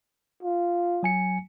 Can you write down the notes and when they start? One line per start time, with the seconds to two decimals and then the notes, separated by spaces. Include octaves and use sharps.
0.43 F4
1.03 F#3 G#5 C#7